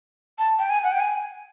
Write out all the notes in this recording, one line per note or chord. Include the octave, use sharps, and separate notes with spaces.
A5
G5
G#5
F#5
G5
G#5